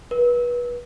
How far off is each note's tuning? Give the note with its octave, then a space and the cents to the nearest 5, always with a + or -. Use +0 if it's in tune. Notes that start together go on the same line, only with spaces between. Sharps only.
B4 -30